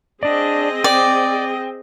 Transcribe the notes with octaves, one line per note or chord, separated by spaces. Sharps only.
C4 D4 G#4 D5 D#5
D5 G5